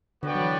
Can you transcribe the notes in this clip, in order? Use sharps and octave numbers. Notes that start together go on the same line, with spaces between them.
D3 B3 F#4 B4 D5 G5
F#3
E3